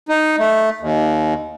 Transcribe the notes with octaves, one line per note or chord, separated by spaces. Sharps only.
D#4
A3
D#2